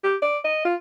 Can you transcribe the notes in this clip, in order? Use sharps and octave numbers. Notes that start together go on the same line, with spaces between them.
G4
D5
D#5
F4